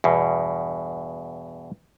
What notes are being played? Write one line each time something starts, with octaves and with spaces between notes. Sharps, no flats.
E2 G2 B2